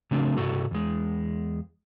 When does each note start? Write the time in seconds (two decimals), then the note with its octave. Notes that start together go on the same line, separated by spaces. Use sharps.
0.11 C#3 F#3 A3 C4 D4 A#4
0.37 G2 C3 F#4 A4
0.71 E2 G#3